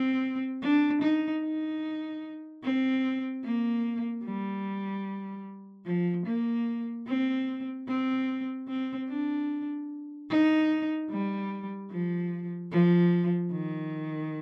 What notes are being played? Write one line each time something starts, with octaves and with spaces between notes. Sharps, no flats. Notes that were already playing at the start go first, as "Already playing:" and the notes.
Already playing: C4
D4
D#4
D#4
C4
A#3
G3
F3
A#3
C4
C4
C4
D4
D#4
G3
F3
F3
D#3